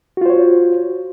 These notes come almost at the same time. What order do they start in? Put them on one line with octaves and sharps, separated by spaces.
F#4 F4 C5 C#5